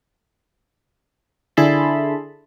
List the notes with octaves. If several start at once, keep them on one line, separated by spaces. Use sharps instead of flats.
D3 E4 G#4 A5 B5 C6